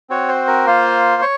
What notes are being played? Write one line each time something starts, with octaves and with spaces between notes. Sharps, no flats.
C4 F#4 C#5
C5
A#4
A#3 F4 C5
C#5